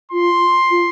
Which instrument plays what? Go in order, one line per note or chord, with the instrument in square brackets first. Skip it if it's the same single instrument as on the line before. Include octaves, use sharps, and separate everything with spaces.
[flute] F4 [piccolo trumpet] C6
[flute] F4